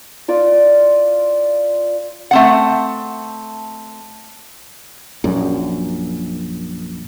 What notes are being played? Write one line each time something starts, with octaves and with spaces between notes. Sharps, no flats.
F4 D5
A3 C4 F#5
A#1 F#2